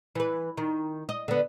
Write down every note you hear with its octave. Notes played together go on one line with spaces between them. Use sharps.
E3 B4
D#3
D#5
D3 B3